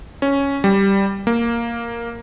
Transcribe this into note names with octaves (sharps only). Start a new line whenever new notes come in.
C#4
G3
A#3